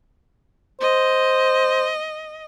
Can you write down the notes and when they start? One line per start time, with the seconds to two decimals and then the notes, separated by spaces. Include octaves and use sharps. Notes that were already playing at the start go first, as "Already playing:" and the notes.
0.81 C5 D#5